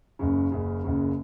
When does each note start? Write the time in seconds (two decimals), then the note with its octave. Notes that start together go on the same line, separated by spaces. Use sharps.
0.19 F#1 F#2 C#3
0.52 F#1 F#2 C#3
0.84 F#1 F#2 C#3